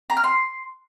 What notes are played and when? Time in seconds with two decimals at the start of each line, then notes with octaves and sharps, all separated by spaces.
0.10 A#5
0.17 F6
0.24 C6